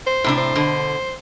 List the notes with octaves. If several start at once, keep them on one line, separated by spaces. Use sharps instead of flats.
C5
A2 C3 D4
C5
B2 D3